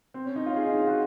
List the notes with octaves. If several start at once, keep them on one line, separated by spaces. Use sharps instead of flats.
C4
C#4
D#4
F4
G#4
D#4
F4
F#4